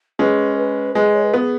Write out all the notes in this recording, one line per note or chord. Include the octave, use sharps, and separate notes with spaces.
G#3 C#4 B4
B4
G#3 B4
C#5
B4
B3 G#4